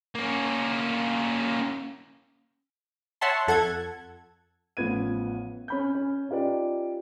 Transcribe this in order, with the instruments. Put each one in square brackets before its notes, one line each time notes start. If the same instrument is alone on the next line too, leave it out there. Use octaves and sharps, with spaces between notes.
[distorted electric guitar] A#3 C#4
[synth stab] C#5 E5 F#5 A5 C6
F2 A4 F#5 G#6
[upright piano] A1 F3 B3 G#6 D#7
C#4 B5 G6
C#4
C#4 D#4 F4 G4 B4 D5